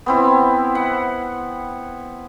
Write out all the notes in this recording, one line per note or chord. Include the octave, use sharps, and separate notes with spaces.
B3 C4 E4
F#5